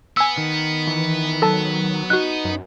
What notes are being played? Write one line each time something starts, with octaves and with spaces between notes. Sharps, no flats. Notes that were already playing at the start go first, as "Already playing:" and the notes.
B3 G#5 E6
D#3
E3
F#3 A4 A5
D#4 F#4 F#6
F#2